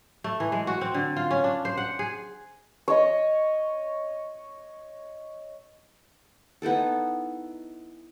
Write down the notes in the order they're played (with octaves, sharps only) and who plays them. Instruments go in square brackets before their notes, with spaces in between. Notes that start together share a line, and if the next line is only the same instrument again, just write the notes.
[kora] A3
E3
G#3
F#4
C4
D3
F4
C#4
D4
C5
F#5
G#4
[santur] C#5 D#5
[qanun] B3 D#4 E4 A4